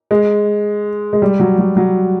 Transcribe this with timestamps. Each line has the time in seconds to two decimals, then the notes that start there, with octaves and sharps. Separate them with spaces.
0.11 G#3
1.13 G#3
1.22 G3
1.40 F#3
1.59 F#3
1.77 F#3